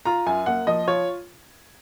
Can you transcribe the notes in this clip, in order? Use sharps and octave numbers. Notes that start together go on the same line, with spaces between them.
F4 A#5
F#2 G#5
A#3 F#5
F3 D#5
F4 C#5